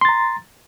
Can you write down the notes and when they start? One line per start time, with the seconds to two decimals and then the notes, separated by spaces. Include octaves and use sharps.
0.01 C6
0.05 A6
0.09 A#5